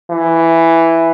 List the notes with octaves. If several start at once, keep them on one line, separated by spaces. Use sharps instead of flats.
E3